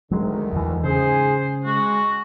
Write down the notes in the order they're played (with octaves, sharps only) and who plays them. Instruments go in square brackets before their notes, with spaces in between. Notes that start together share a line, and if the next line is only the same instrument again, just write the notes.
[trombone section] D2 D#3 [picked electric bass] F#3 G#3
[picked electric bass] E2 E3
[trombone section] G#2 G#4 [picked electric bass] C#3 [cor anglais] C5
[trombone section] G#3 [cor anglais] F#4